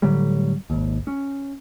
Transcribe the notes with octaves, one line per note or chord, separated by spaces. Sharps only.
A2 D3 F#3 G3
G#1 D#2
C#4